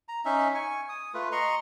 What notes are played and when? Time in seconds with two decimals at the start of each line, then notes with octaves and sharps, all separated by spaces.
0.08 A#5
0.25 C#4 D#4 E5
0.55 G#5 C#6
0.89 D#6
1.14 A3 F4 B4
1.32 D#5 A#5 C6 C#6